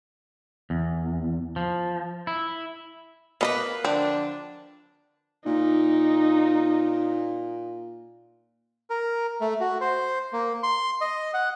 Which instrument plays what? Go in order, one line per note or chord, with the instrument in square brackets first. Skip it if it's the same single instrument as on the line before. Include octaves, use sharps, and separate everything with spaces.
[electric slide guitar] E2
F3
E4
[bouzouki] A#3 B4 [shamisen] B3 D#5
[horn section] D3 F3 D4 [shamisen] C4
[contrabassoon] A#2 [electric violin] D#4
[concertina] A#4
A3
F#4
C5
A#3
C6
D#5
F#5